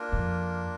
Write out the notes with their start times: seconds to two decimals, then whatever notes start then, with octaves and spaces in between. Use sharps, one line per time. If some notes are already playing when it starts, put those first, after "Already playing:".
Already playing: A#3 D4 F4 A#4
0.12 F2